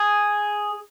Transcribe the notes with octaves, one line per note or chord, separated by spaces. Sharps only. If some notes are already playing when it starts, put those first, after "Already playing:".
Already playing: G#4